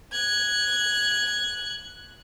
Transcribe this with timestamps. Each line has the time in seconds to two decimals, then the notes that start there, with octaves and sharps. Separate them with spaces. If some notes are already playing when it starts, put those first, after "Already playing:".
0.13 F#6 G#6